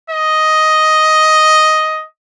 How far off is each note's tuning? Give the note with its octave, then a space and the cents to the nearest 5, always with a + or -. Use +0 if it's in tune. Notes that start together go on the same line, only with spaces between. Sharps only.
D#5 +5